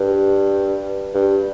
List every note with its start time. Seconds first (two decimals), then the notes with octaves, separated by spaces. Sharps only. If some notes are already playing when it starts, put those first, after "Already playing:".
Already playing: G2
1.14 G2